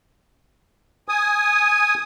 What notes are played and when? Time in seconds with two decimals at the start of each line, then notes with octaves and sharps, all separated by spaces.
1.08 G#5 D#6